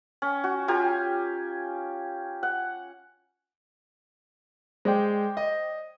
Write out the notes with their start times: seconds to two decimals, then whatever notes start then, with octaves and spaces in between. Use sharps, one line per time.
0.22 C#4
0.44 F#4
0.68 F4 G4 G#5 A#5
2.43 F#5
4.85 G#3 C5 D5 G5
5.37 D#5